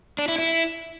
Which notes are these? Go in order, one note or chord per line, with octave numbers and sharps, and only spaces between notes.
D4
E4
E4